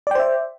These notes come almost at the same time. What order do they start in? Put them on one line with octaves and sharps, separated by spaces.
D5 G5 C5 E5